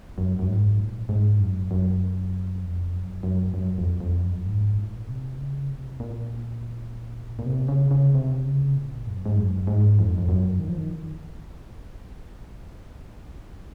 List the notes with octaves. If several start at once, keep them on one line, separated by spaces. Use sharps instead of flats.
F#2
F#2
G#2
A#2
G#2
F#2
F#2
F2
F#2
F#2
F#2
F2
F2
F#2
G#2
A#2
C3
C#3
C3
A#2
A#2
C3
C#3
C#3
C3
C#3
A#2
F#2
G#2
F#2
G#2
F2
F2
F#2
D#3
F3
D#3